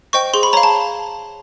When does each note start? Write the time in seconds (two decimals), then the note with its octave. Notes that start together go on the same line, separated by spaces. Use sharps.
0.13 C5 D#5 G5 C#6
0.34 G#4 C6
0.43 B5
0.53 C#5 F5 A#5
0.63 A5